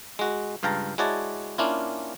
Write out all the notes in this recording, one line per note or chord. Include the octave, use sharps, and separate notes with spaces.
G#3 F#4
C#2 G2 F5 G5 A5 A#5
G#3 E4 F#4 C#5 D5 A5
A#3 C#4 D4 E4 F4